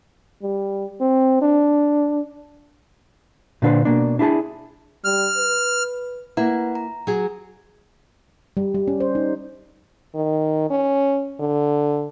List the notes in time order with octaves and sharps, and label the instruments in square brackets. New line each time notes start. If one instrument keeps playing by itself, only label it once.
[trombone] G3
C4
D4
[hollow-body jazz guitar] A#2 D3 D4 B4 C5
B2 A#3 D4
D4 E4 G#4 A5
[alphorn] G3 [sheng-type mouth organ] F6
[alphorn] B4
[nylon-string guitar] A#3 E4 [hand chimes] B4 F#5 A#5
[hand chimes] A#5
[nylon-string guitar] F#3 G#4
[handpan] G3
G3
C#4
C5
D#4
[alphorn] D#3
C#4
D3